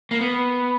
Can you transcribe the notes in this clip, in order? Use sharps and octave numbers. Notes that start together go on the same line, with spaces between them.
A#3
B3